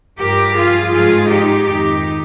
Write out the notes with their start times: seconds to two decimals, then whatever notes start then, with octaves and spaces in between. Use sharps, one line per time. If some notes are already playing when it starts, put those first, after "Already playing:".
0.19 G2 F3 G4 A#4
0.56 F4 G#4
0.92 G#2 F3 F4 G#4
1.29 D#4 G4
1.65 F2 D#3 D#4 G4